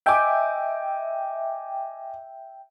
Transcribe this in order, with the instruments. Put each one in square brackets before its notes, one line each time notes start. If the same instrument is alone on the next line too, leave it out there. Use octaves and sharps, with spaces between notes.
[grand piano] D#5 G#5 D6 [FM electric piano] E5 G5